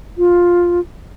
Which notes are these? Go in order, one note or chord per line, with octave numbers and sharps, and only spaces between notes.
F4